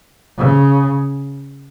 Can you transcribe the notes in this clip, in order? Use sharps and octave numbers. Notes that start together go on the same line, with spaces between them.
C#3